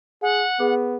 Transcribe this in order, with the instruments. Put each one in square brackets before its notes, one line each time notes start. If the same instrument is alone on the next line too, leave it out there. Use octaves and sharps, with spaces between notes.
[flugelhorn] G#4 [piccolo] F#5
[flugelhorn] B3 [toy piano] G#4